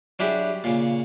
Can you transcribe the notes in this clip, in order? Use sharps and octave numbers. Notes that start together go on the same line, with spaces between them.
F#3 D4 E4 G4 G#4
A#2 C#3